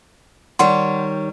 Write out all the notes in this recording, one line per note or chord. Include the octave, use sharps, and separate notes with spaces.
D#3 G3 C#5 F#5 C6